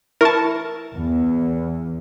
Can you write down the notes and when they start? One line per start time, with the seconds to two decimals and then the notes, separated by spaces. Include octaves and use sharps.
0.21 E4 A#4 A5 C#6
0.95 E2